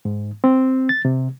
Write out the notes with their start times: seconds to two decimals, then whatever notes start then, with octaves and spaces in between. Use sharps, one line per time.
0.05 G#2
0.44 C4
0.89 A6
1.05 C3